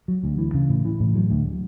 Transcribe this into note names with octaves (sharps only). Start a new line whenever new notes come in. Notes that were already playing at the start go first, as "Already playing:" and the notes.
F#3
D2
E3
C#3
A2
E3
A2
F#3
D2